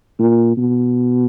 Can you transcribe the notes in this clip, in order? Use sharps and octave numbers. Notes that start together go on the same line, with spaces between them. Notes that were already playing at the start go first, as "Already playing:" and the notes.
A#2
B2